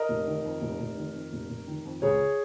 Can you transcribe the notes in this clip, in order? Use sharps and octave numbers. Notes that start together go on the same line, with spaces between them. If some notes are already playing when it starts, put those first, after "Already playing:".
Already playing: A#4 D#5
F1
D#3
F2
F1
F1
D#3
F2
F1
F1
D#3
F2
C#2 G#4 C#5